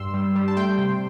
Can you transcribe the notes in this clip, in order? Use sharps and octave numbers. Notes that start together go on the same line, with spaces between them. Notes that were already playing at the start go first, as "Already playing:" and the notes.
Already playing: G2 C6 E6
G3
G3
A5
A3 G5 C6
C3